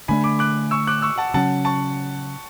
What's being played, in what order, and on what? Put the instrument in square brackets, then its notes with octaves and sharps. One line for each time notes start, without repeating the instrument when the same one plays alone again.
[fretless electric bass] D3 A3 D4 [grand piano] G#5 B5
[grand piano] B5 D6
D6 F#6
C#6 E6
D6 F#6
C#6 E6
F#5 A5
[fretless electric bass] C#3 F#3 C#4 [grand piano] F#5 A5
[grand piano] A5 C#6